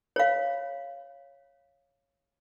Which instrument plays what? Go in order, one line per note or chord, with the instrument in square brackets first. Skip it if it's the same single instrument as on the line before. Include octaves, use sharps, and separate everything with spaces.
[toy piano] C#5 F5